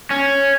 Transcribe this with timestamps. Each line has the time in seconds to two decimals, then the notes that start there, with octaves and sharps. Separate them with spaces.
0.10 C#4